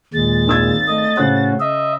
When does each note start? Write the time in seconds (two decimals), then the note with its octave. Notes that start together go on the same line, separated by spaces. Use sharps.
0.14 D#2 A#2 G#3 A6
0.47 G#1 E6 G#6
0.87 A3 D#5
1.17 A2 C#3 C#4 F#4 C5 F#6
1.60 D#5 E5